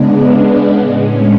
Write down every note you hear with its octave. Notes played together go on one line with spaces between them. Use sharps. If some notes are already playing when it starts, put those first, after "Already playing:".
Already playing: C#3 G#3 B3 D4
A2 G#3 C#4